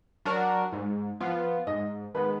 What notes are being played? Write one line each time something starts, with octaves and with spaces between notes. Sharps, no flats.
F#3 D4 F#4 A#4
G#2
F3 B3 F4
G#2 D#5
D#3 G#3 B3 B4